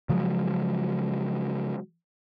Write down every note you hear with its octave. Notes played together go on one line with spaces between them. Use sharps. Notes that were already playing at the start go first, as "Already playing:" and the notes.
C#3 F3 F#3 G#3